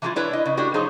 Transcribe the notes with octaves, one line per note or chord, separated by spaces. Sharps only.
E3 F3 G#3 A3 E4 F4
D4 E4 B4 C#5
D#5
C#3
A3 D4 E4 F#4 G4
F3 D#4 F4 G#4 C5 C#5